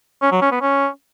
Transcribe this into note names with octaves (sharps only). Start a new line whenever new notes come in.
C#4
F#3
C#4
B3
C#4